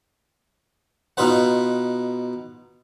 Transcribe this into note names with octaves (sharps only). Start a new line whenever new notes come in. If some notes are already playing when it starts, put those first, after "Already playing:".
B2 D#4 F4 B4 F#5